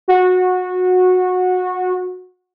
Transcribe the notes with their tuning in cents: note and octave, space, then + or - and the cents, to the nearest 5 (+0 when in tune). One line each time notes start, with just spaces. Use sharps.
F#4 -20